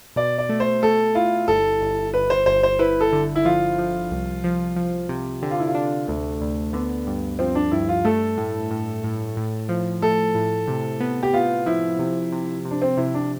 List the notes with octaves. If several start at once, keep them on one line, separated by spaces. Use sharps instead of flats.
B2 D5
D5
A3
C5
A3 A4
E4 F4
G1 A4
G1
G1 B4
C5
G1 C5
C5
E4 B4
A4
D3
E4
F3 F4
F3
C2
F3
F3
C3
D3 G4
F4
E4
F4
D4
D2 A3
D2
D3 B3
G2
F3 C4
D4
G2 E4
F4
A3 A4
A2
A2
A2
A2
F3
A3 A4
A2
C3
B3
G4
B3 F4
F3 E4
C3
C3
C3
D4
C4
C3 E4
D4